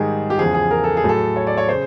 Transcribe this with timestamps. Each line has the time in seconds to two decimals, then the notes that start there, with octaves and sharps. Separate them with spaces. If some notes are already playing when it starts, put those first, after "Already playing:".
Already playing: G#2 D#3 G3 G#4
0.30 G4
0.38 E2 C#3 F3 G#4
0.54 G#4
0.71 A#4
0.84 A4
0.97 G#4
1.04 A2 F#3
1.09 A4
1.36 C#5
1.47 D5
1.57 C#5
1.69 C#3 C5